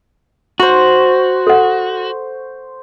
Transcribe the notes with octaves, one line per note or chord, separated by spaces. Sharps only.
F#4 C5 C#6
A4 F#5